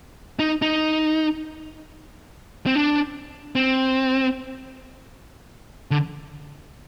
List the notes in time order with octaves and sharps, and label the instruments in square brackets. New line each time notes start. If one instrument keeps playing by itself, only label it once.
[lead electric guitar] D#4
D#4
C4
D4
C4
D3